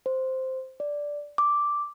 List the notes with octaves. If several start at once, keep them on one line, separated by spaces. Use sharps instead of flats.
C5
D5
D6